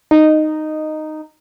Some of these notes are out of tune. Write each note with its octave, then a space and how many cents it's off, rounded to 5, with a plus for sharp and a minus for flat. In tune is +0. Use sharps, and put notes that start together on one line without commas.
D#4 -10